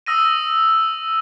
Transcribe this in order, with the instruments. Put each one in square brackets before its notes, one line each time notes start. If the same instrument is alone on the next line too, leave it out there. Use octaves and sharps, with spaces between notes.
[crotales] D#6 E6 A#6 D#7